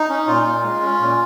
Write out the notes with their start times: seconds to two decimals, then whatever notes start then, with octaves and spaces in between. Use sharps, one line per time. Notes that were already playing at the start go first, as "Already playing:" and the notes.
Already playing: D#4
0.09 C#4
0.27 A#2 F4
0.45 A#2
0.63 G#3
0.82 C#4
1.00 A#2